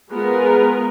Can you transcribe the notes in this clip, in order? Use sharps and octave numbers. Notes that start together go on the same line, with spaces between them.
G#3 B3 F4 G#4 A#4 B4